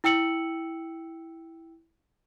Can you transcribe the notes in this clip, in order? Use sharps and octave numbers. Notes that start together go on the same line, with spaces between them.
E4 G5 E6 C#7 F#7